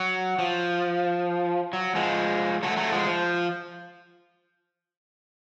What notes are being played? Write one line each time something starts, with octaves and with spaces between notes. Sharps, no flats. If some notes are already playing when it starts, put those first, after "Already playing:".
Already playing: F#3
F3
F#3
F3 G#3
F#3 A3
F#3 A3
F3 G#3
F3